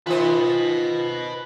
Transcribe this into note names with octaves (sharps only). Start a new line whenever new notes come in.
D#3 F4 B4 C5 D#5